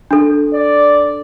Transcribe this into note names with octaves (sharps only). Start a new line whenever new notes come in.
D4 A4
D5